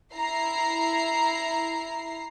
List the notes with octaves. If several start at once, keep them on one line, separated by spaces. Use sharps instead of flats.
E4 A#5 C7